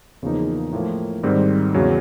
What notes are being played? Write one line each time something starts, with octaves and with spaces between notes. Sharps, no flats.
E2 C#3 F3 A#3 D#4
A2 F3 A#3
G#2 D#3 G3 C4
E2 C#3 F#3